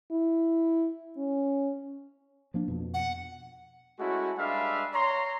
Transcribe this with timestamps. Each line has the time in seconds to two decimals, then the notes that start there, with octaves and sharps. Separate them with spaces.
0.11 E4
1.18 C#4
2.54 F3 A#3 D4
2.68 F2 B2
2.94 F#5
3.99 G#3 A3 C#4 E4 F#4
4.38 G3 G#3 D4 B4 E5 F5
4.94 C#5 A#5 C6